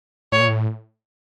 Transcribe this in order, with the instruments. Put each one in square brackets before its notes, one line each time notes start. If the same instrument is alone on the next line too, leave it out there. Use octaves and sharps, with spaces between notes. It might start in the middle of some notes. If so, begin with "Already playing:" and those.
[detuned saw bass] A2 [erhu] C#5
[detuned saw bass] A#2
A2